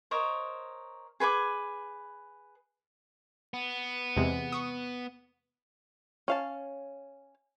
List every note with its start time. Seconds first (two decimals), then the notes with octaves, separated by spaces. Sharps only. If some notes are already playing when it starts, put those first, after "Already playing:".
0.11 A#4 C5 C#5 D#5
1.20 G#4 B4 G#5 D6
3.54 B3
4.17 E2 C3 G#3
4.52 C#6 D#6
6.28 C#4 F5 A5